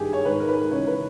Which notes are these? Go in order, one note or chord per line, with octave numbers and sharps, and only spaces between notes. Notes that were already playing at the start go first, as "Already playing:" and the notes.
Already playing: G2 D#3 G4 G#4
C#5
G#2 D#3 B4
A#4
B4
C#2 C#3 E3 C#5
B4